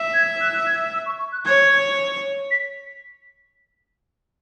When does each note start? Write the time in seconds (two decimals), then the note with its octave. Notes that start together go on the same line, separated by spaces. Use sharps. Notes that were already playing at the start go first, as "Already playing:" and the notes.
Already playing: E5
0.14 G#6
0.41 F#6
0.67 G#6
0.93 E6
1.06 C#6
1.19 C#6
1.32 F#6
1.45 C#5 G#6
2.51 B6